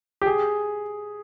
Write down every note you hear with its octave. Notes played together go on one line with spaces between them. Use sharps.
G4
G#4